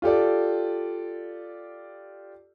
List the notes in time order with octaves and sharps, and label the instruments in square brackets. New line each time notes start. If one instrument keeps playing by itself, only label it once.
[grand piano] F4 G4 A4 D5